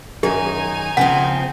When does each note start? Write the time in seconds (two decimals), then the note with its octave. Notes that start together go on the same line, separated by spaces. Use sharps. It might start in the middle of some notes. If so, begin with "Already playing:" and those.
0.23 F#2 D#3 D#4 G#4 G#5
0.97 C#3 F3 C4 F#5